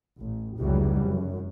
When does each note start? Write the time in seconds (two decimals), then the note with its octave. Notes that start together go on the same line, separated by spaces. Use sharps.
0.19 A1
0.59 F1 C#2 C#3 E3 F#3 G3
1.09 F#2